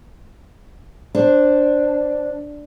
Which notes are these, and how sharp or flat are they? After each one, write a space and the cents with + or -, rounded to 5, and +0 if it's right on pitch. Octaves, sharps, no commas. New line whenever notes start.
D4 +0 C5 +10